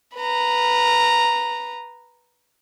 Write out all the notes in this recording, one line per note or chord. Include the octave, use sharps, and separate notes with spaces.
B4 A#5